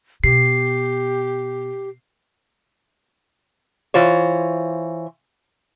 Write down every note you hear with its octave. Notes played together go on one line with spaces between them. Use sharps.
B2 G4 C7
E3 F4 C5 C#5